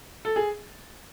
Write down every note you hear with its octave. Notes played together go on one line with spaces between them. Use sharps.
A4
G#4